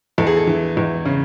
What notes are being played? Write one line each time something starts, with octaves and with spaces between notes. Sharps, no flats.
E2 A4
G#4
A4
E3
E2
C#3